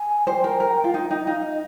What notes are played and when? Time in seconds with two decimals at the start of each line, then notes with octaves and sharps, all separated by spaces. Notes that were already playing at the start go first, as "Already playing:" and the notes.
Already playing: G#5
0.27 C5 G5
0.44 A#4
0.60 A#4
0.84 F4
0.94 D#4
1.11 D#4
1.27 D#4 F5
1.44 D#5